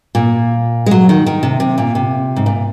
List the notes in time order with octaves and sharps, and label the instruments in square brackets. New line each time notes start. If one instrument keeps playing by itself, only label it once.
[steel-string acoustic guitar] A#2
G#3
F#3
D#3
D#3
C3
C3
A#2
C3
G#2
A#2